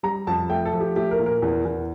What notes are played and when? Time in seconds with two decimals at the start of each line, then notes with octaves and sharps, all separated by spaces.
0.03 G3 A#5
0.27 F2 A5
0.50 A3 G5
0.65 A4
0.73 F3
0.80 G4
0.96 A3 G4
1.11 A#4
1.19 A#2
1.26 A#4
1.42 E2
1.65 E2